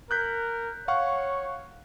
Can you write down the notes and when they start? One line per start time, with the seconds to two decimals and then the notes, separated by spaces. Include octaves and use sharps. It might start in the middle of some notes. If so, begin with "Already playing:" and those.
0.11 A#4 F#6 G6 B6
0.88 C#5 F5 F#5 C#6